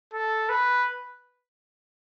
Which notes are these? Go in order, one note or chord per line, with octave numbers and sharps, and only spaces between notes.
A4
B4